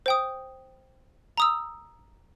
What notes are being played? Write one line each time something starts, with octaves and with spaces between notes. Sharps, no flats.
C5 G5 D#6
A#5 D#6 E6